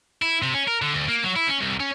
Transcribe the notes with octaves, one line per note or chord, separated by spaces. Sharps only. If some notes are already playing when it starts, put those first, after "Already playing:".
E4
C3
C#4
A#4
D3
D2
A#3
F#3
E4
C#4
C2
C#4